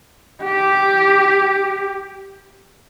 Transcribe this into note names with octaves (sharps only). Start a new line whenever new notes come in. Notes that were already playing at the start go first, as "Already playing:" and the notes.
G4